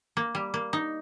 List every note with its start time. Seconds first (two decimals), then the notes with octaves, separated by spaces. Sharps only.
0.17 A#3
0.35 G3
0.54 A#3
0.73 D#4